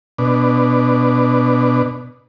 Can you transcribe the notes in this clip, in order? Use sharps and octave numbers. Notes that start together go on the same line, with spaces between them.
B2 D4